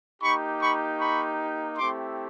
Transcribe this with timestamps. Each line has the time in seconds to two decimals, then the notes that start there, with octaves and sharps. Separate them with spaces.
0.21 A#3 D#4 G4 B5 C#6
0.60 B5 C#6
0.99 B5 C#6
1.77 A3 C4 E4 G4 C6 D6